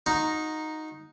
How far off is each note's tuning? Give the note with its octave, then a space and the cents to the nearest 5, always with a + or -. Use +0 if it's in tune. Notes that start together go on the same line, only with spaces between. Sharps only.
D#4 +0 F#4 -35 A#5 +0